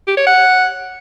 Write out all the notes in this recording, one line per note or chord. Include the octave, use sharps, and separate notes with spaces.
G4
C#5
F#5